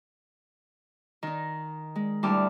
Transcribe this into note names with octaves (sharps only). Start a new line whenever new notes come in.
D#3 D#4
G#3
D2 G3 E4 A5 D6 F6